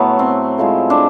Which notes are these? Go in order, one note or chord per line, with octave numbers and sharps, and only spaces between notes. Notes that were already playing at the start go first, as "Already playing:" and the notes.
Already playing: A2 F#3 A3 B3
C4
A2 F3 G#3
D4